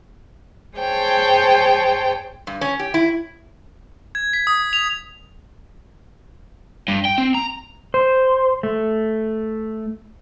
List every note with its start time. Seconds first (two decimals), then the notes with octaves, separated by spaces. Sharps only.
0.77 G#4 C5 C#5 G5 A5
2.47 G2
2.61 C#4
2.79 G4
2.94 E4
4.15 G#6
4.33 B6
4.47 D#6
4.73 F7
6.88 G2
7.05 G5
7.18 C4
7.35 A#5
7.94 C5
8.63 A3